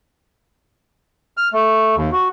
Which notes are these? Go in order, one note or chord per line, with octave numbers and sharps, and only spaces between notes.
F6
A3
D#2
F#4